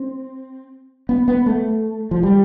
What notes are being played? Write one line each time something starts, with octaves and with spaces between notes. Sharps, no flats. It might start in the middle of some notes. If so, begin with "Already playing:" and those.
Already playing: C4
B3
B3
A3
F3
G3